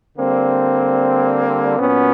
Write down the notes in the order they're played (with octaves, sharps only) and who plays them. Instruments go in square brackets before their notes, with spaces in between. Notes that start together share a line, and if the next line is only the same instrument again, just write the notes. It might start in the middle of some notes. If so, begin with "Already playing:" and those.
[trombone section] D3 G3 A#3 C4
A#2 F#3 B3 C#4